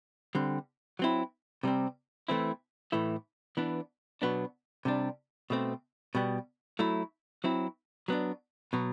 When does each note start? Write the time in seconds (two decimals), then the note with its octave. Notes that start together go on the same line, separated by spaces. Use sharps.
0.35 D3 G3 C4
0.99 F#3 C4 E4
1.63 C3 G3 C4
2.28 E3 A3 C4 E4
2.92 A2 E3 A3 E4
3.57 E3 B3 D4
4.22 B2 F#3 B3 D4
4.85 C3 G3 D4
5.50 B2 A3 C4
6.15 B2 G3 B3
6.79 F#3 A3 E4
7.44 F#3 C4 E4
8.08 F#3 B3 D4
8.73 B2 F#3 B3